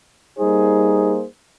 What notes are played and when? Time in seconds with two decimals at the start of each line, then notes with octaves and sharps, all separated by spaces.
0.38 G3 A#3 D#4 G#4 C5